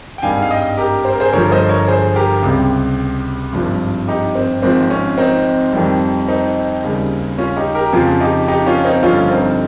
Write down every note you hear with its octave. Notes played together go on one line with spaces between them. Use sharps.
G5
G#1 G2 D#3 G3 F5 G#5
F5
D#5 G5
G4 A#4
C5
A#4
G#4 C5
G1 G2 F3 A#4 C#5
C5 D#5
A#4 C#5
G#4 C5
G4 A#4
C#2 C3 G3
G#1 G2 F3
D#4 G4
C4
G#1 G#2 F3 C4
C#4
C4 D#4
F2 D#3 G3
C4 D#4
D#2 C#3 G3
C#4 F4
D#4 G4
G4 A#4
F2 C#3 F3 F4 G#4
D#4 G4
D#4 G4
C#4 F4
C4 D#4
G1 G2 F3 C#4 F4
C4 D#4